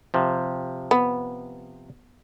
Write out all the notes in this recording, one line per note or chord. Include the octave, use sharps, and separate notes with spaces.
C3 F3
B3